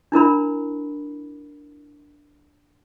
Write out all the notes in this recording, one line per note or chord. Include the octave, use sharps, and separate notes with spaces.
D4 E4 A#4 B5